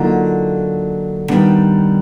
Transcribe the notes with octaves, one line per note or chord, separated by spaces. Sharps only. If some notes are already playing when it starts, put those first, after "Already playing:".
Already playing: D3 F#3 A#3 D#4 F4
D#3 G3 B3 D4